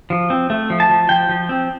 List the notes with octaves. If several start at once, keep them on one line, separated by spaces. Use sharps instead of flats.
F3
C4
A3
F3
A5
F3
F3 G5
F3
C4